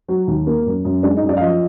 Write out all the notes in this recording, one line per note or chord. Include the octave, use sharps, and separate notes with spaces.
F#3
D#2
A#3
F#2
F#2
G#3 D4
D#4
F#2
D5
F5
F3 D#5